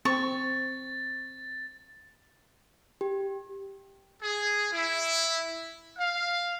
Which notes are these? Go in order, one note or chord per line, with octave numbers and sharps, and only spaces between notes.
C4 C#6 A6
G4
G#4
E4
F5